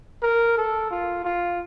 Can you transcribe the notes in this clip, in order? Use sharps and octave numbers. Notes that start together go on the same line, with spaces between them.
A#4
A4
F4
F4